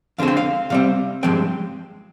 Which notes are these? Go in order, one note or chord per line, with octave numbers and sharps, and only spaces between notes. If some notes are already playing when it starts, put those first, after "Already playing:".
F2 D3 G#3 C4 F5
G5
F5
C3 G3 C4 F5
G2 F3 G#3 C4 G5